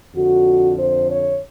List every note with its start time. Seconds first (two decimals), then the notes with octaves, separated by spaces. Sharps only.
0.15 F2 D3 F#4
0.79 C5
1.10 C#5